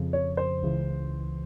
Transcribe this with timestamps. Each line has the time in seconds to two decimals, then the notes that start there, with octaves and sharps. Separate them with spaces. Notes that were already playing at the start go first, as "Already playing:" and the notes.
Already playing: F2 C#3 F3
0.13 C#5
0.37 C5
0.62 C#2 C#3 E3